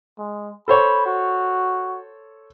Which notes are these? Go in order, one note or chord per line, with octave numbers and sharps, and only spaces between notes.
G#3
A4 C5 C#5 B5
F#4